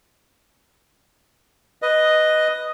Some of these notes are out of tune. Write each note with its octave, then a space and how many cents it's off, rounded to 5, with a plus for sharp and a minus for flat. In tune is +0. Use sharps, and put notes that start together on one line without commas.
B4 +0 D#5 +0